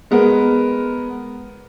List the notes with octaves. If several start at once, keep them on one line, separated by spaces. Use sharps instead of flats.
G#3 B3 A#4